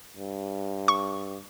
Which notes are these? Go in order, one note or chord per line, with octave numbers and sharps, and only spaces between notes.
G2
C#6